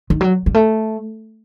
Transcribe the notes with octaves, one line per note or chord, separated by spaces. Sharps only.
D#3
F#3
G3
A3